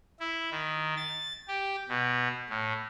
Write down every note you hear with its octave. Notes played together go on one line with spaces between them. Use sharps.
E4
D#3
A6
G4
B2
A2